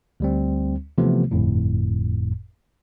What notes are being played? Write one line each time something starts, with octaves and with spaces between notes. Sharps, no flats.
D2 G3 C4
C3 E3 F3 A3 B3
G1 F2 A2